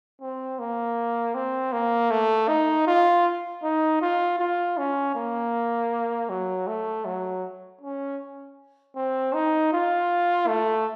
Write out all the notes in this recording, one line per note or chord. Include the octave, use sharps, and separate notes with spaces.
C4
A#3
C4
A#3
A3
D#4
F4
D#4
F4
F4
C#4
A#3
F#3
A3
F#3
C#4
C4
D#4
F4
A3